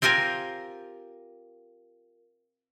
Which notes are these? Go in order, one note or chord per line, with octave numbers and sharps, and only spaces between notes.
C4 F4 G4 A#4 G#5